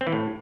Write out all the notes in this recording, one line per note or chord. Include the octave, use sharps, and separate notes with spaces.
C4
E3
A2